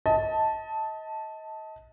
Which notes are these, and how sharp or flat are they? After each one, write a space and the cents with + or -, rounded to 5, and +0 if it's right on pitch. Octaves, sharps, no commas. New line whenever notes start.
D#5 +30 A5 +0